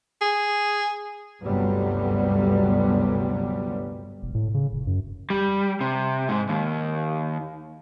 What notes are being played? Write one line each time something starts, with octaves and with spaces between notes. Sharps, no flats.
G#4
G1 D2 C3 F#3 G3 B3
E1
A2
C#3
F1
F#2
G3
C3
G#2
D#2